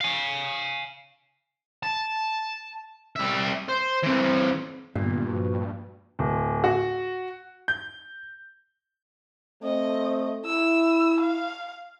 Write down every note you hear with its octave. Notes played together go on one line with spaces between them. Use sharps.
F5 G#5
A5
G3 E5
C5
E3 C4
G2 A#2 D3 G3 B3
F3 F#4 B4
D1
F#4
G6
A3 C4 D#5
E4 E6
F5